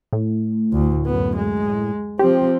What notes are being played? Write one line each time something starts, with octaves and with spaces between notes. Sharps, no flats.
A2
D2
F#2 B3
G#3
F3 C4 G4